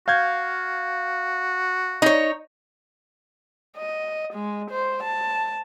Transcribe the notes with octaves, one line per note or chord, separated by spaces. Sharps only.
F#4 F5 G6 G#6
D#4 C#5
D#5
G#3
C5
A5